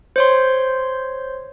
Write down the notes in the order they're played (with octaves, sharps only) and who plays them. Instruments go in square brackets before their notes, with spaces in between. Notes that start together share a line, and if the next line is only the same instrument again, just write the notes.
[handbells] C5 C#5 C6